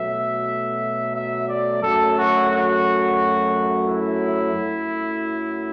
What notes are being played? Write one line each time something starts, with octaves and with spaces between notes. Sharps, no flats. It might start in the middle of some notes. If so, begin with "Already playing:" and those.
Already playing: B2 F#3 A3 E5
E5
D5
F#2 F#3 A3 A4
F#4
F#4
E4
F#2 F#3 A3